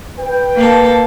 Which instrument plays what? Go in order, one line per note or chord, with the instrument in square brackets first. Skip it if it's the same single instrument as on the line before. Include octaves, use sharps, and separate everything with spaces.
[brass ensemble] B4 G5
[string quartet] A#3 A4